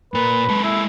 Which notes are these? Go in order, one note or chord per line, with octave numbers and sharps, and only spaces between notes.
A#2 A#4 B4
G#3 A4
E4